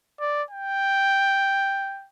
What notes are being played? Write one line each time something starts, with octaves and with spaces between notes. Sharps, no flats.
D5
G5